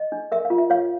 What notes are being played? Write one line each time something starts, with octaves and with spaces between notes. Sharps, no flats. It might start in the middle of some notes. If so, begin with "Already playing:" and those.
Already playing: D#5
D4
A#4 E5
F5
F4
E5
C#5 F5